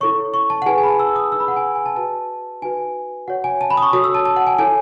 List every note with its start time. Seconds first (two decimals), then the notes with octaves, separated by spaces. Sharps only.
0.01 E4 A4 C#5 C#6
0.34 C#6
0.50 A5
0.62 F#5
0.66 E4 G#4 B4 G#5
0.78 G#5
0.83 B5
0.88 A5
0.99 E6
1.16 D#6
1.32 D#4 G#4 B4 E6
1.40 B5
1.48 F#5
1.56 G#5
1.75 G#5
1.86 A5
1.96 F#4 B4 A5
2.62 D#4 F#4 B4 G#5
3.28 F#4 C#5 F#5
3.44 G#5
3.61 A5
3.71 B5
3.77 D#6
3.82 C#6
3.93 F#4 A4 C#5 D#6
4.04 E6
4.15 A5
4.25 A5
4.36 F#5
4.47 G#5
4.58 E4 A4 C#5 G#5